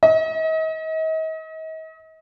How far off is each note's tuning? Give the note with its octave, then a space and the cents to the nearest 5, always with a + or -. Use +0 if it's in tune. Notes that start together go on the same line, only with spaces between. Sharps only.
D#5 +40